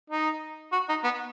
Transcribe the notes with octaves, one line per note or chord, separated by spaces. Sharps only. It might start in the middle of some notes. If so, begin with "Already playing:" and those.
D#4
F#4
D#4
B3